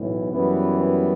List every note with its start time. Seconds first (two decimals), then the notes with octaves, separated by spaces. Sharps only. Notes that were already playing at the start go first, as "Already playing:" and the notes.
Already playing: B1 A2 E3
0.30 F#2 E3 G3 B3
0.79 B3